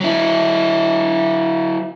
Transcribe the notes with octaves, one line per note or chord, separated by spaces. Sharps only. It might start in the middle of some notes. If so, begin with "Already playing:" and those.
F#3 E4